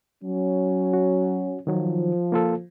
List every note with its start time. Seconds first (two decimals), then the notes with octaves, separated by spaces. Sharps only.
0.24 F#3 C#4
0.93 F#4
1.67 D#3 F3 F#3
2.32 A#3 F4 A4